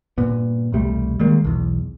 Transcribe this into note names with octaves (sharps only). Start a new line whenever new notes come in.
G2 A#2 B3
E1 C2 G3 A3
D#3 G3 G#3 A#3
B1 E2